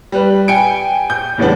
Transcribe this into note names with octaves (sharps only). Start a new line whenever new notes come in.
G3 B4
G5 G#5 C#7 D7
G6
E2 A2 C#3 G3 B3 D4